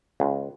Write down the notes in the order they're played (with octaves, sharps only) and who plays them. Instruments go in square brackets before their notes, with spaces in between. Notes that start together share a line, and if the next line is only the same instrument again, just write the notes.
[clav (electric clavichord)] C#2